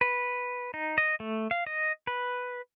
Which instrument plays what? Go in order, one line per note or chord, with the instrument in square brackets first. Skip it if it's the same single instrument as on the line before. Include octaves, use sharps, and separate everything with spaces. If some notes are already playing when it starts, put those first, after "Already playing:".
[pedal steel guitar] B4
D#4
D#5
A3
F5
D#5
B4